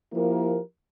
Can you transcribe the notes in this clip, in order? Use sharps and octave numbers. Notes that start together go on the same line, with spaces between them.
F3 A#3 E4 G4 A#4